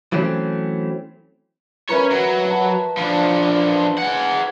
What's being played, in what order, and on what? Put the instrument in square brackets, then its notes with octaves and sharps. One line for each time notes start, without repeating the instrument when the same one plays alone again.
[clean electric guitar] E3 F#3 A3 C4 C#4
[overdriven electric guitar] C#4 C#5 [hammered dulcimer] A#4 B4 E5
[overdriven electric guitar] F#3
[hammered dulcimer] A5
[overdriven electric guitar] F3 D4
G#4 F#5